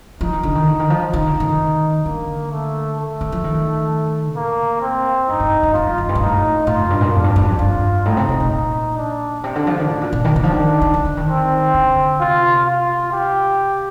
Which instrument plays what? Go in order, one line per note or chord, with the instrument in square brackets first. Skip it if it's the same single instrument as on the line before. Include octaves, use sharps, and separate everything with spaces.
[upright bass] F3 [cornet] D#4
[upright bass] D#3
D3
D#3
D3
D#3
F3
[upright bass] D#3 [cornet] D#4
[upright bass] D3
D#3
[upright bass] D3 [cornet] A#3
[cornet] A3
A3
[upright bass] D#3
F3
D#3
[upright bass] A2 [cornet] A#3
[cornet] C4
[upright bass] G2 [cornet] D#4
[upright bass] G2
G2
[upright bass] G2 [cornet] F4
[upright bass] F2
F2
G2
A#2
[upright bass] A2 [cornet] D#4
[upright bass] A2 [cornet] F4
[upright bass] F2
G2
A#2
[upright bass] F2 [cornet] D4
[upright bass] G2
G2
F2
[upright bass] G2 [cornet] F4
[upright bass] A2 [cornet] D#4
[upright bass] C3
C3
A#2
[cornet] D#4
D4
[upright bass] C3 [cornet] D4
[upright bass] D3
F3
D#3
A2
A#2
A#2
D#3
[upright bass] D#3 [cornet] D4
[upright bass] F3
D#3
D#3
D3
D3
D#3
[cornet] C4
[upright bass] D3
[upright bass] C3 [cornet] F4
[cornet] F4
G4